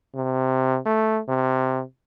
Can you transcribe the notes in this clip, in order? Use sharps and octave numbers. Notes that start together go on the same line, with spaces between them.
C3
A3
C3